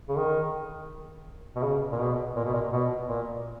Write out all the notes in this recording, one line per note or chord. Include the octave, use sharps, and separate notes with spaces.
C#3
D#3
B2
C#3
A#2
B2
A#2
B2
A#2
B2
A#2